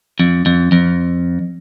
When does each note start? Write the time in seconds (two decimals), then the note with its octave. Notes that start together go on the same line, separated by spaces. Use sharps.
0.20 F2
0.46 F2
0.72 F2